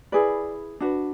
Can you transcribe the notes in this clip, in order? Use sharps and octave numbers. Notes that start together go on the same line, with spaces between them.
E4 G#4 B4 D5
D4 F#4 B4